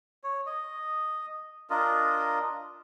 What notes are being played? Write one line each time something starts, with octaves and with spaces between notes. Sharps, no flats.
C#5
D#5
D4 F4 A#4 D#5